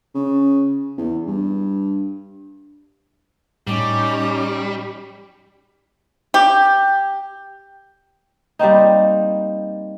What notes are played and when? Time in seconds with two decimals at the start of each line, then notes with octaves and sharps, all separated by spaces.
0.15 C#3
0.98 E2
1.27 G2
3.67 A2 G3 C#4 D#4 D6
6.34 G4
8.59 G3 A#3 C4 D#4